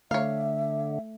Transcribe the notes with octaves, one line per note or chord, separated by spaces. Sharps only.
D3 A3 C#5 E5 F5